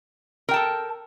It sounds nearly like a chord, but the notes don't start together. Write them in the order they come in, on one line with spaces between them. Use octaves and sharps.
A#4 G5 A5 A4